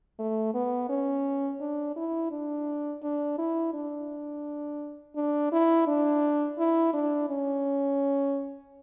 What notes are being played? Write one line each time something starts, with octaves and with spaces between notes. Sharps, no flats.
A3
B3
C#4
D4
E4
D4
D4
E4
D4
D4
E4
D4
E4
D4
C#4